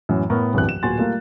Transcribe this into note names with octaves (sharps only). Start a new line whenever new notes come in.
F#2 A2 E3 F#3
A2 B3 A#4 C#6
D1 C2 G2 E3 F#6
E7
D1 A#2 F#4 G#5 C6 A6
G3 A3 A#3 F4